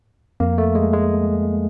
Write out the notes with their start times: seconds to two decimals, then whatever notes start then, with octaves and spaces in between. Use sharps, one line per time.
0.40 F2 A#3
0.58 A3
0.75 G#3
0.93 G#3